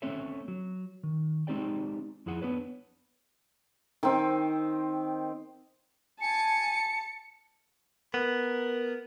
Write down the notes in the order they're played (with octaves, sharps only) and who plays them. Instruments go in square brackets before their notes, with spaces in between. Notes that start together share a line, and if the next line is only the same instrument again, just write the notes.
[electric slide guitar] A3 C4 C#4 A4 C#5 E5
F#3
D#3
G#3 C4 D#4 G4 D5 G5
F2 E4 G#4 F#5
B3 D4 B4 C#5
[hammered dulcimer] D#3 C4
[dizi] G#5 [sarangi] A5 [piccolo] C#7
[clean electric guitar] B3 [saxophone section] A#4